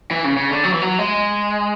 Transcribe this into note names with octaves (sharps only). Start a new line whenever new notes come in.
E3
C#3
C#3
D3
F#3
E3
F#3
G#3